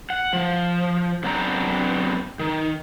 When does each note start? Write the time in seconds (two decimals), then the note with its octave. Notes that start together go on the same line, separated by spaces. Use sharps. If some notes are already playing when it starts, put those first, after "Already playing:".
0.10 F#5
0.33 F3
1.23 F#2 B3 C4 D4 A#5
2.39 D#3